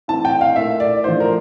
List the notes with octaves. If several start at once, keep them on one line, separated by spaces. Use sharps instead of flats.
E3 A3 C4 E4 A5
G5
F5
A#2 A3 E4 E5
D5
F3 A3 E4 C5
A#4